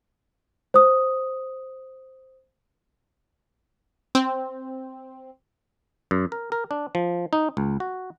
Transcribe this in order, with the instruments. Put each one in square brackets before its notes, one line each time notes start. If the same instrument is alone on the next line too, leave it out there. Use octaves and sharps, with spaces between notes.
[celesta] C5 D#6
[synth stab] C4
[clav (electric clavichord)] F#2
A#4
A#4
D4
F3
D#4
C#2
F#4